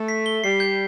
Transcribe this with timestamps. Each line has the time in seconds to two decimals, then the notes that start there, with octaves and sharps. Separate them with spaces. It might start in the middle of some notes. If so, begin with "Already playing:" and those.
Already playing: A3
0.08 B6
0.26 G7
0.44 G3 C7
0.60 G6